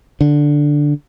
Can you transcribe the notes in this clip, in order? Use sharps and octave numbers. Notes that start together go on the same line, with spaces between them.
D3